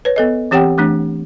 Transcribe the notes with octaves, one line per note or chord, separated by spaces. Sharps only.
B4 C#5
B3 A4 D#5
E3 C4 G4 C#5 F#5 G5
E3 A3 D4